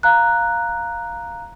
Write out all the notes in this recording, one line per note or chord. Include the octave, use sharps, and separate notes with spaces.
F5 A#5 F#6